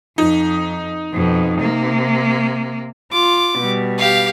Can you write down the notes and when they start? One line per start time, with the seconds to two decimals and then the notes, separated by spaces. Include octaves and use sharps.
0.18 F2 D#4
1.13 F2 B2
1.59 C3 A#3
3.12 F4 D6
3.58 B2 G3
3.98 G4 F5